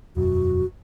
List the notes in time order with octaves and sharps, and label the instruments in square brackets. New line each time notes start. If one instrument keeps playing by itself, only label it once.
[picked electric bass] E1 F#2 [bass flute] F#4